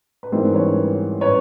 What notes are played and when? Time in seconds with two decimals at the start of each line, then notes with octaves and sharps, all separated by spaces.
0.23 B4
0.32 G#2 E3 G3 C4 A#4 C5
0.54 B4 C#5
1.21 B4 C#5